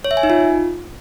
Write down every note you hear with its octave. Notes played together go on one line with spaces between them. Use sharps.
C#5
E5
G#5
D#4
F4